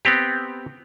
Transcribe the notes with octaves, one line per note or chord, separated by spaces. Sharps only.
B3 C4 G4